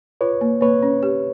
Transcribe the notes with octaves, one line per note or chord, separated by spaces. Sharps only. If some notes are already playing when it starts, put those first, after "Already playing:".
F4 B4 C#5
A#3
A#3 B4 C#5
C#4
G4